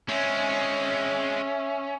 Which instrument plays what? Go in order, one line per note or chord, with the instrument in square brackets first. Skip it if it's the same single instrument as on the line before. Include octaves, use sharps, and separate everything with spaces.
[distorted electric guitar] G#3 C4 [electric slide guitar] C#4 [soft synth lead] E5